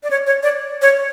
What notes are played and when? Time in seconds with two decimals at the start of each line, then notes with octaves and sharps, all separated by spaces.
0.03 D5
0.11 C#5
0.27 C#5
0.43 D5
0.82 C#5